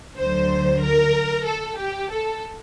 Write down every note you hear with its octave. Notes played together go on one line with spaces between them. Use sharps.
D2 D3 F#3 C5
A#4
A4
G4
A4